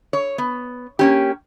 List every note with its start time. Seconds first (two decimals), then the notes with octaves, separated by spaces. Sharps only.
0.13 C#5
0.38 B3
0.99 A#3 C#4 G4